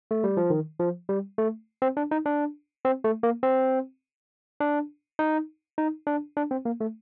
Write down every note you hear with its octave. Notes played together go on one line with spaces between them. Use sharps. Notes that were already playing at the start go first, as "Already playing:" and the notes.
A3
G3
F3
D#3
F3
G3
A3
C4
D4
D#4
D4
C4
A3
A#3
C4
D4
D#4
D#4
D4
D4
C4
A#3
A3